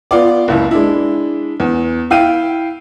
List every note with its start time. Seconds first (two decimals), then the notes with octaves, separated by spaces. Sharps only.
0.11 B3 F4 D5
0.48 F#1 C#2 E4
0.71 G#3 D4 E4
1.60 E2
2.10 E4 F5 G5 D#7